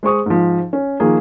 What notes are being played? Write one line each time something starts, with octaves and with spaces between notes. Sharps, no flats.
G#3 C5 C#6 D#6
G#2 F3
C#4
D#3 F3 A#3 G#4